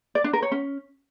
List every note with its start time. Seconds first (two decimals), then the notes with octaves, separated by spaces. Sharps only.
0.15 D5
0.24 D4
0.33 A#4
0.42 C#5
0.52 C#4